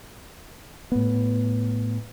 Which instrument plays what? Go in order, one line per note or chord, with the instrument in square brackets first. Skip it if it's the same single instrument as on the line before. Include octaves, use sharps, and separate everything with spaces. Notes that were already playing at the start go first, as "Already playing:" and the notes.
[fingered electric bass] A2 B3